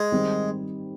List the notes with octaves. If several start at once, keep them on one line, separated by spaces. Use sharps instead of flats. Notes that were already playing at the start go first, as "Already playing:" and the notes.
Already playing: G#3
D#3 G3 C4